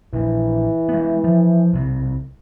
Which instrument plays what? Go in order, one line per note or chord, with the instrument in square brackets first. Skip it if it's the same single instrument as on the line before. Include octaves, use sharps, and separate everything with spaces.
[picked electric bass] A#1 A#2 [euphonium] E3
[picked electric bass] G#3 B3
F3
B1 C3